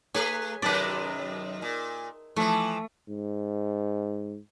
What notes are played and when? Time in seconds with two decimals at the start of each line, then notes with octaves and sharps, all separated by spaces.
0.14 A3 G#4 B4 C#5
0.62 F#2 C3 D#3 B4 D5
1.62 A#2
2.36 E3 F3 A3
3.09 G#2